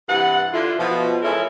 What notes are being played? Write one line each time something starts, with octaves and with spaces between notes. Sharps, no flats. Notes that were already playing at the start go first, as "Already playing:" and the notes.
G2 C3 E3 B4 F#5
D3 E4 F4
B2 F3
E3 G#3 C#4 E4 A4 A#4